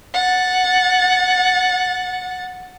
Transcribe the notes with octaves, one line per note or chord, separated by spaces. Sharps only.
F#5 A6